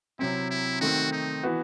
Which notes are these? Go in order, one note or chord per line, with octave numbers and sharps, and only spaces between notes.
C3 F#3 C4 E4
E4
D#3 A3 C4 F#4
D#4
E3 B3 F#4